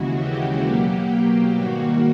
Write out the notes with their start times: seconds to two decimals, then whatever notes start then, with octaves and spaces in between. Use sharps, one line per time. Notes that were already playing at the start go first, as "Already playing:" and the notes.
Already playing: D#2 C#3 E3 G#3 F#4
0.18 G4
0.63 B2 F#3 A#3 G4
1.55 G#2 D#3 G3 A#3 F#4